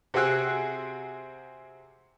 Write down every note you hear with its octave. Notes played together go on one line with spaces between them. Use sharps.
C3 C4 F#4 G#4 E6 F#6